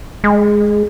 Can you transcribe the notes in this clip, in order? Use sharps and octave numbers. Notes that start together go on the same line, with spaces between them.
G#3